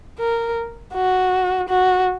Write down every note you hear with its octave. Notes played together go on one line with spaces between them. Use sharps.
A#4
F#4
F#4